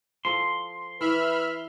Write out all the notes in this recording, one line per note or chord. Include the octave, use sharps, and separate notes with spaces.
F3 A4 C6
E3 B4 E5 B5 F6